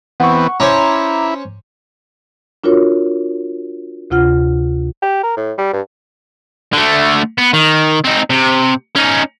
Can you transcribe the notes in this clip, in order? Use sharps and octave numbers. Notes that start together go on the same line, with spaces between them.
E3 B3 C4 F#5 C#6
C#4 E4 C5 C#5 A#5 D6
D4 F4 F#4 A#4 C#5
D2 C3 F4 F#5 F6
G4
A#4
A2
G3
G2
D3 A3
B3
D#3
C4 D#4
C3
C#4 D#4